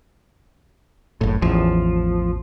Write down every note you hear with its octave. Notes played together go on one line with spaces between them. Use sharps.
F#1 A2
A1 E2 F3